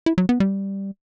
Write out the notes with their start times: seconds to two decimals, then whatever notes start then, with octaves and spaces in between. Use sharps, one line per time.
0.06 E4
0.18 F#3
0.29 B3
0.40 G3